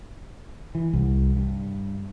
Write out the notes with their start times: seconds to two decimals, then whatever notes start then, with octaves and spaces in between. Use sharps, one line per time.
0.75 E3
0.93 C2
1.36 G2